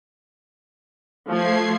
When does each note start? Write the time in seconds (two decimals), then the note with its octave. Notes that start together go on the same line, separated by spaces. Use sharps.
1.29 F3 A3 G#6 C7